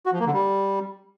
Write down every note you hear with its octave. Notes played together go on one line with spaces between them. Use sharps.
F#4
F3
A#3
D3
G3